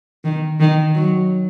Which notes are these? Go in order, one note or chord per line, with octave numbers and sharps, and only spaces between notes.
D#3
D#3
F#3